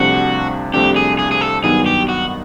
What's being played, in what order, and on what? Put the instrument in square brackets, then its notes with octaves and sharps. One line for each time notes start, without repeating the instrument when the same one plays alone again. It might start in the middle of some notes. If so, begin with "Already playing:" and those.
Already playing: [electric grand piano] C2 C3 F3 A3 D4 [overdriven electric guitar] F#4
[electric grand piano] C2 C3 F3 A3 D4 [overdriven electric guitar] G4
[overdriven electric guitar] G#4
G#4
G#4
A4
[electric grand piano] G2 D#3 F#3 B3 D#4 [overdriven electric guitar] G#4
[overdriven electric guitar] G4
F#4